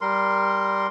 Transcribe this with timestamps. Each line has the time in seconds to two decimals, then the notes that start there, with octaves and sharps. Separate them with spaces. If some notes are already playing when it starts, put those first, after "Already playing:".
0.01 G3 A#4 C6